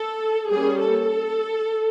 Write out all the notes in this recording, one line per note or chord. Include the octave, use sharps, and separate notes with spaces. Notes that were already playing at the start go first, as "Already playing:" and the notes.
Already playing: A4
G3 A#3 C#4 G#4
A4